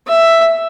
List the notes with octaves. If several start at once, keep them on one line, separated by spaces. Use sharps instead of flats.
E5